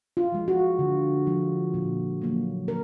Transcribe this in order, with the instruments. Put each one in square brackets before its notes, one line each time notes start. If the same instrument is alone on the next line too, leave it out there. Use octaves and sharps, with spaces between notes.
[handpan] F4
F3 G#3
F#4
D3
F3 G#3
A#2
F#3 A#3
A#4